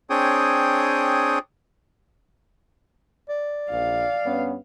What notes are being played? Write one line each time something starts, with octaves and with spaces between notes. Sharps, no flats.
C4 D4 G#4 C#5 G5 D#6
D5
A#1 F5
G2 B3 C#4